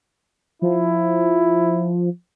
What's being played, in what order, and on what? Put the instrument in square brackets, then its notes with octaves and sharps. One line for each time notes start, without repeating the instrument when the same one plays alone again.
[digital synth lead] F3 [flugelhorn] E4